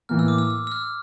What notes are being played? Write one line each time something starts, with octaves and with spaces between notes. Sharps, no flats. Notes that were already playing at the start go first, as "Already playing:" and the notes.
A2 E3 A#3 F6
E6
D6
E6
E6
E6
F6